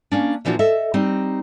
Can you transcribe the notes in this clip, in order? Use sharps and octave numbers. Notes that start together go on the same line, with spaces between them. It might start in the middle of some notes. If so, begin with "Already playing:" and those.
A#3 C#4 D4
A#2 E3 F3 D4 F#4
A4 D#5 E5
G3 C4 D#4